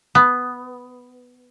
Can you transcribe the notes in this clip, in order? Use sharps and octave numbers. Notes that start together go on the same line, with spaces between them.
B3